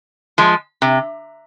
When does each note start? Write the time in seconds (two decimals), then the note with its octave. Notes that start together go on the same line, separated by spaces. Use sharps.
0.38 F3 G#3
0.82 C3